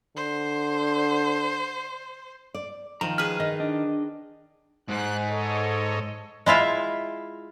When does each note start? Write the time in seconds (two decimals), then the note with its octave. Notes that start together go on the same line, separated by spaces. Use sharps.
0.16 D3 C5
2.54 D5
3.01 D#3 F3 A#5
3.18 G#4 B4 F6
3.40 D#3 D#5
3.60 D4 D#5
4.89 G#2 F#6
5.28 A4 C#5 D#5
6.46 G#3 E4 F4 E5